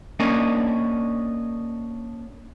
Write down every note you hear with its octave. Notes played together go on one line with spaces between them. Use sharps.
A#3 C#4 D4 D#5